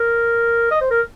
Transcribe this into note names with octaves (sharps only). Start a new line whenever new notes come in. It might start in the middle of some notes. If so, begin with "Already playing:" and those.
Already playing: A#4
D#5
C5
A#4